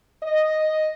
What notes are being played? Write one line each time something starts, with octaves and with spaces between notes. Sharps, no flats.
D#5